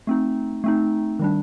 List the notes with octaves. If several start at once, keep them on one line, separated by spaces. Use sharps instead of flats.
A3 C4 D#4
A3 C4 D#4
D#3 G3 D4